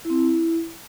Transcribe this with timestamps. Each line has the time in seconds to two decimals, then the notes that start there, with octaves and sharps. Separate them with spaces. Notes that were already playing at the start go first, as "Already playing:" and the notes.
0.05 E4
0.10 C4
0.15 E4